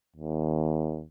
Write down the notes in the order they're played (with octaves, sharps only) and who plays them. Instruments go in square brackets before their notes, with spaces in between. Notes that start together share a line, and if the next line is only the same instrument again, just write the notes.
[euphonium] D#2